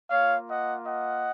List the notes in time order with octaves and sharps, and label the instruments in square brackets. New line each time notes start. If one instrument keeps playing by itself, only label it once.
[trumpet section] A#3 F4 C#5 F5
D#5 F#5
D#5 F#5